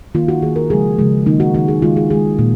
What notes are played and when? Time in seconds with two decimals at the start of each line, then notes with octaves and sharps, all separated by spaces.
0.15 D#3 A#3 F4
0.28 F#4
0.43 D#3 A#3 G#4
0.56 A#4
0.70 C#3 F3 G#3 G#4
0.98 C#3 F3 G#3
1.26 D#3 A#3 D#4
1.40 F#4
1.55 D#3 A#3 F#4
1.68 G#4
1.82 D#3 G#3 F4
1.96 G#4
2.10 D#3 G#3 G#4
2.39 A#2